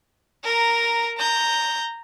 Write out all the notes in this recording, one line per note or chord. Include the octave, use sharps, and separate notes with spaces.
A#4 A#5
A#5 G6